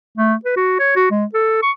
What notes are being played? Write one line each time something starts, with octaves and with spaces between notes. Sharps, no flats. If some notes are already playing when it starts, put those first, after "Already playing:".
A3
B4
F#4
C#5
F#4
G#3
A4
C#6